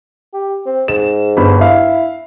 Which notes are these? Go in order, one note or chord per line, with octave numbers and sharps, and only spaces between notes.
G4
C4
G#2 E7
G1 B5
E4 F5